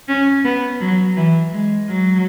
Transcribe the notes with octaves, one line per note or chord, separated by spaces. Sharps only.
C#4
B3
F#3
E3
G#3
F#3